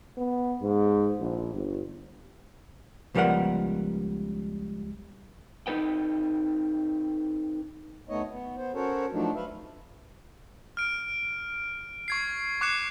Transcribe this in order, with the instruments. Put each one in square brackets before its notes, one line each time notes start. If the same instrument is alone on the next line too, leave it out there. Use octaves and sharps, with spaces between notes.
[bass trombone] B3
G#2
A#1
G1
[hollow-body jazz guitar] C#2 F3 G3 B3 A#4 F#5
[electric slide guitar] C4 D#4 A4 B4 G5
[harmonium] D2 A3 B3 D#4 C#5 D#5
B3
B3 C5
C#4 F#4 A4 A#4 C5 C#5
F3 F#3 A3 D4 D#4
B4 E5 F5
[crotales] F6 D7
C#6 G#6 C7
C#6 D6 F#6 C7 C#7 E7